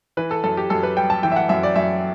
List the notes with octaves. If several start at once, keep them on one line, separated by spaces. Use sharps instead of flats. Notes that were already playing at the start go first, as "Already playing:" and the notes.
E3 B4
A4
F#2 A4
G4
F#2 A4
B4
G3 G5
A5
E3 G5
E5
F#5
F#2 E5
D5
F#2 E5